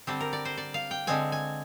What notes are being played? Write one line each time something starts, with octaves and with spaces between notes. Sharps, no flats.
D3 G3 C4 G4
A#4
D5
C5
D5
F5
G5
D3 G#3 C4 G#5
G#5